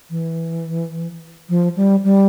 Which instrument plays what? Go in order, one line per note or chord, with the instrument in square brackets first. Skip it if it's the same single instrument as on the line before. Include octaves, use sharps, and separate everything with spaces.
[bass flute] E3
F3
G3
G3